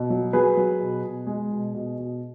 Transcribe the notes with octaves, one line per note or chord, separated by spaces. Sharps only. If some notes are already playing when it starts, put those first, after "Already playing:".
Already playing: B2
F#3
F#3 G#4 B4
F#3
B2
B2
G#3 G#4
B2
B2
B2